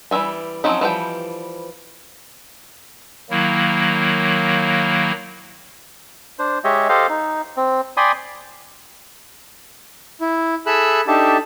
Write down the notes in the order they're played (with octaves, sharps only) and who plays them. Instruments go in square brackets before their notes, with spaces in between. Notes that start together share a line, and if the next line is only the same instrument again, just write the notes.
[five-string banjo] E3 G3 G#3 E5 G#5
F3 F#3 C4 C#4 D#4
E3 F3 G3 G5
[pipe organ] D#3 F#3 A#3 E4
[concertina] D4 C5
G#3 G4 C#5 D#5 E5
G4 A4 C5 D#5 F5
D#4
C4
D5 G5 G#5 B5 C6 D#6
[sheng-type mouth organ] E4
G#4 A4 E5 B5 E6 F#6
D4 D#4 G4 A4 E5 A5